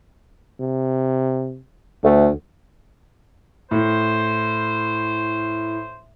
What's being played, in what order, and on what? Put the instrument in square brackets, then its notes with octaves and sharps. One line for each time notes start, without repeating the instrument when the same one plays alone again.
[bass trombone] C3
[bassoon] D2 [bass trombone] A3
[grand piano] A2 [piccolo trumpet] C5